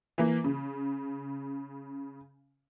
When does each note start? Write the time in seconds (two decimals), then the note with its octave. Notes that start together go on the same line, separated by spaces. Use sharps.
0.18 E3 A#3
0.44 C#3